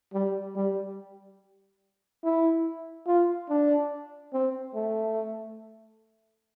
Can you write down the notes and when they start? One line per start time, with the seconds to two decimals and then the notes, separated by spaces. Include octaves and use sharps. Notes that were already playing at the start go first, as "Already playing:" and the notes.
0.13 G3
0.56 G3
2.23 E4
3.07 F4
3.49 D4
4.33 C4
4.75 A3